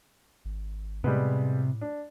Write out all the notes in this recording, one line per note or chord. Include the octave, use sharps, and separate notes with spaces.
G#1
A2 C3 G3 G#3 B3
D4